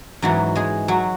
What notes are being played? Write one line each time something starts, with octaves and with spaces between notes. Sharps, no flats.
G#2 E3 F#3 F#4
G#3 G#4
F#3 F#4